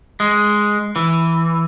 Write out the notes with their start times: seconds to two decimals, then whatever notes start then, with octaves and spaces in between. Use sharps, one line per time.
0.20 G#3
0.96 E3